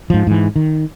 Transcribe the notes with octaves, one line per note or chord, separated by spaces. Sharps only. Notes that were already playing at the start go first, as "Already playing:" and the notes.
G#2 F3
G#2 E3
D#3